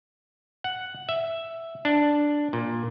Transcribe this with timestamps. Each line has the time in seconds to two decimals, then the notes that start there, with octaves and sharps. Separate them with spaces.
0.64 F#5
1.09 E5
1.85 D4
2.53 A#2